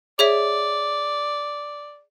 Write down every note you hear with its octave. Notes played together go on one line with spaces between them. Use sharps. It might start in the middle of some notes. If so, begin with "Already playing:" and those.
G#4 C#5 D5 E5